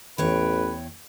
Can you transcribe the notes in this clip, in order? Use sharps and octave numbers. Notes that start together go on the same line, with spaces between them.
A1 E2 B4 C#5 G5